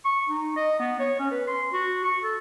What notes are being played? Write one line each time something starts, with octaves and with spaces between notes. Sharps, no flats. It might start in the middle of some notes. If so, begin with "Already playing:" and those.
C#6
D#4
D#5
B3
C#5
C#4
B4
C6
F#4
C#6
A4